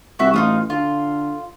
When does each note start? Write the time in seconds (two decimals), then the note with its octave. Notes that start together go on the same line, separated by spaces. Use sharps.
0.19 C2 F#4 E5
0.34 A1 D#4 F4 D#6
0.70 D3 F4